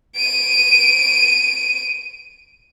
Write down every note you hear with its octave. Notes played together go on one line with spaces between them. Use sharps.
D7 D#7